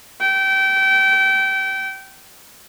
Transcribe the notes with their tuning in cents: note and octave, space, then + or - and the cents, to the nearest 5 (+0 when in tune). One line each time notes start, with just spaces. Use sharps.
G5 -25